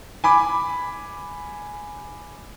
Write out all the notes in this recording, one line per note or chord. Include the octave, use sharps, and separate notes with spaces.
G#5 B5 D6